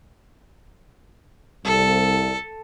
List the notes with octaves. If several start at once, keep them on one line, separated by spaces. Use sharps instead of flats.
C2 A4